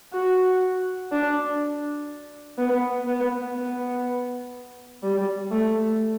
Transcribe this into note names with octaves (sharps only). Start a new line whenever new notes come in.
F#4
D4
B3
B3
B3
G3
A3